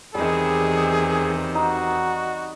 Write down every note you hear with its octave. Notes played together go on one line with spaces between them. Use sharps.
E2 C3 D#3 G3 G#4 D#5
D#4 F#4